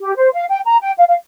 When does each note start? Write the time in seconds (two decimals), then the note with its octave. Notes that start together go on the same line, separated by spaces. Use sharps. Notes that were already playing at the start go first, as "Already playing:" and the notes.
0.01 G4
0.17 C5
0.33 F5
0.49 G5
0.66 A#5
0.81 G5
0.97 F5
1.08 F5